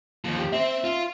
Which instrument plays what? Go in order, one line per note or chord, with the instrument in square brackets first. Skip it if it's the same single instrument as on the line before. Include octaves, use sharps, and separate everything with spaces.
[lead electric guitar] D#2 F3
[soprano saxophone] G4
[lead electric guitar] C4 [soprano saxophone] E5
[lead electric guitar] F4